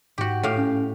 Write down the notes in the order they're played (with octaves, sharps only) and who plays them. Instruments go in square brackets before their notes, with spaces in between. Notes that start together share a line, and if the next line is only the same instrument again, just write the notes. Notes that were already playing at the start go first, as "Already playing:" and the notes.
[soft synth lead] G#2 [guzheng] F#4 G4
[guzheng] A2 G4 F5
[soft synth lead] C#4